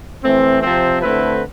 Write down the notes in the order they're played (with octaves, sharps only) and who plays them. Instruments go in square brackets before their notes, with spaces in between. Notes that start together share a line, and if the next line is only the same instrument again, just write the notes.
[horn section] E3 A3 C4
C3 F3 C4
D3 A3 C4 E4 B4